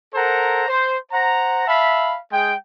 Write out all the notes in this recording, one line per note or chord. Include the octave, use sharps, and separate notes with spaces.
A4 A#4 C5 F#5 A#5
C5
C5 F#5 A#5
E5 F5 A5 B5
G#3 G#4 G5